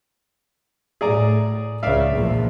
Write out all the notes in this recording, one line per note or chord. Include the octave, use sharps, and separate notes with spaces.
A2 G#4 D5 A#5
C#2 C#3 D5 E5 F5
A#1 E2 F3